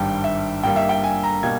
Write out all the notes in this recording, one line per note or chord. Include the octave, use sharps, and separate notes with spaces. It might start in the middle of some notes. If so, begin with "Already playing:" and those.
Already playing: G#1 G2 G3 G5
E5
G2 G3 A#3 G5
E5
G5
G#5
A#5
B2 G3 A#3 G#6